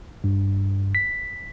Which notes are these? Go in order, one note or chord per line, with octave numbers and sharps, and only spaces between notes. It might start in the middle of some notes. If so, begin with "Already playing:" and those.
G2
B6